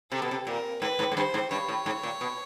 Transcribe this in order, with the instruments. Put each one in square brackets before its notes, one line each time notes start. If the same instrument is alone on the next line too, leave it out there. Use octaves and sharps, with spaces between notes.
[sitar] C3 [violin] A4
[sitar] B2
C3
[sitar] A#2 [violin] A#4
[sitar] G#2 [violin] B4
[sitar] G#2
G#2
[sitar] G2 [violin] C5
[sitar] G#2
[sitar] G2 [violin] C#5
[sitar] A2
G#2
A#2
B2